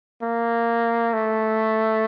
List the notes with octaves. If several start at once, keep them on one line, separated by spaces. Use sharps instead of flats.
A#3
A3